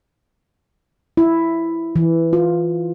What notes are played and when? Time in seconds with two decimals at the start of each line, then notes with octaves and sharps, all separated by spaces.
1.17 E4
1.96 E3
2.33 F4